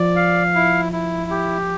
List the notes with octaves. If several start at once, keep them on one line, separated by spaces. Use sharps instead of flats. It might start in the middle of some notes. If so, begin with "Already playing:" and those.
Already playing: F3 D5
F5
E4
E4
G4